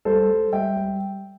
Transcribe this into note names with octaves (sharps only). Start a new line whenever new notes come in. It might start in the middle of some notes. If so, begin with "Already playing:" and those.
G3 A4 C5
G3
G3 E5 G5
G3